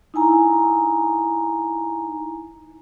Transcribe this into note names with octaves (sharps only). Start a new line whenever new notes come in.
D#4 E4 G#5 A#5